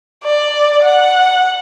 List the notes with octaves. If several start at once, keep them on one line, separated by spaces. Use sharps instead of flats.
D5
F#5